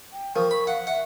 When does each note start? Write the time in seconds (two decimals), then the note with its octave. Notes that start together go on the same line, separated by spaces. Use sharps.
0.13 G5
0.36 F3 A#4 C#6
0.51 B5 C#6
0.67 F5 F#5
0.87 E5 F#5